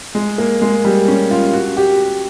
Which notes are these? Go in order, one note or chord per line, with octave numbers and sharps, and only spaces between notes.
G#3
A#3
G#3
G3
C#4
F4
F#4
G4